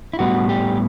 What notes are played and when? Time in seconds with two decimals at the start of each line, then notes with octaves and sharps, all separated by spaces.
0.13 E4
0.19 A2 G3 B3 F#4
0.49 G4